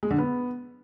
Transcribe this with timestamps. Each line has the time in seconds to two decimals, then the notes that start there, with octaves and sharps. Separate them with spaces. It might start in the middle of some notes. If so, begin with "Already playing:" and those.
0.03 G#3
0.10 D3
0.18 B3